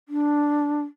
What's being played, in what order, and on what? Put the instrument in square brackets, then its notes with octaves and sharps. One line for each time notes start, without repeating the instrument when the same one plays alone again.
[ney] D4